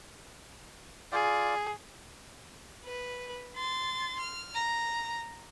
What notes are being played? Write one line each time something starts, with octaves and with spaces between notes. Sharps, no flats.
F4 G#4 D5
B4
C6 A6
F6
A#5